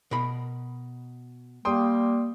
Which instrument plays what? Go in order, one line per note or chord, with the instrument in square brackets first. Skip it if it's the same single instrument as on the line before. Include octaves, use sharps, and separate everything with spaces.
[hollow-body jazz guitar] B2 A#4 B5
[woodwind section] G3 A#3 [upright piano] G5 C6 D#6